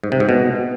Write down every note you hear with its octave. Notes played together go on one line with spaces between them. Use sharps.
G#2
C3
G#2
B2